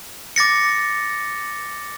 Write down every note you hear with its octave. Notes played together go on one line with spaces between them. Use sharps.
D6 A6 A#6 C#7